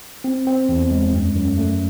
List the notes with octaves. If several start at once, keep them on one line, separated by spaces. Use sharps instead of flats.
C4
C4
E2
G#3
F#2
F#2
A3